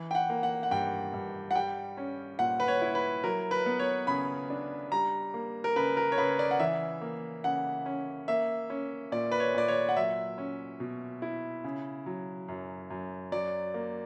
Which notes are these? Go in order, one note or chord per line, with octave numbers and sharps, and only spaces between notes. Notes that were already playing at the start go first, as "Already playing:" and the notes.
Already playing: E3
G5
F#5
A#3
F#5
F#5
G2 G5
G2
F#5
G3 G5
C#4
A#2 F#5
B4
C#5
E4
B4
F#3 A#4
B4
B3
C#5
C#3 B5
D4
G3 A#5
A#3
A#4
C#3 B4
A#4
C#5
C#3 B4
D5
F#5
E3 E5
A#3
C#3 F#5
C#4
A#3 E5
C#4
A#2 D5
B4
C#5
A#2 D5
C#5
F#5
F#3 E5
C#4
B2
E4
C#3
F#3
F#2
F#2
F#3 D5
A#3